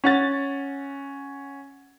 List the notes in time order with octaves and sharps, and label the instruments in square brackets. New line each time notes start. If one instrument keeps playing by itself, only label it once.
[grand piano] C#4 F#5 A6